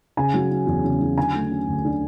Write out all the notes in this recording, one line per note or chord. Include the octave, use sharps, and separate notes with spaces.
C#3 G#5
F#3
C#4
E2
C#3
F#3
D3 G#5
A3
C#4
D2
D3